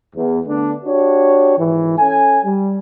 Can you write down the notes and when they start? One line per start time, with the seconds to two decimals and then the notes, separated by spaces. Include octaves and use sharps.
0.15 E2
0.45 D3 A3 B3 D4
0.84 D4 F#4 G4 C#5
1.57 G#1 E3
1.98 C#4 A4 G#5
2.44 G3